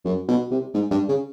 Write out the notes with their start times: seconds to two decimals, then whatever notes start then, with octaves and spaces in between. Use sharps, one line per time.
0.05 F#2
0.28 B2
0.51 C3
0.74 G#2
0.91 G2
1.08 C#3